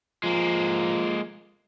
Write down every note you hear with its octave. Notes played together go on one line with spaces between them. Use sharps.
F3 G#3 A#3